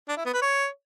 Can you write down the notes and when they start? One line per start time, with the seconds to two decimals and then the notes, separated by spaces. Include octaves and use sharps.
0.09 D4
0.17 E4
0.25 B3
0.34 B4
0.42 C#5